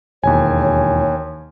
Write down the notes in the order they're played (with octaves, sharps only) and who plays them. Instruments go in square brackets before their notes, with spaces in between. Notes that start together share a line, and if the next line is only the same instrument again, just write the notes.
[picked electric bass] E1 [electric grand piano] D#2 G#5 [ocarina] C#5
[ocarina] C#5